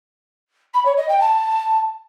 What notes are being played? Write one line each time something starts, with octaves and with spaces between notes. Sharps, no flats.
B5
C#5
D#5
G5
A5